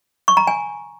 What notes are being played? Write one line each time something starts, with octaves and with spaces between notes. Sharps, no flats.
C#6
A#5
G#5